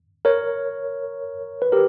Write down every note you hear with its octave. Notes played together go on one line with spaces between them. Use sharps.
A#4 C#5
B4
G4 A#4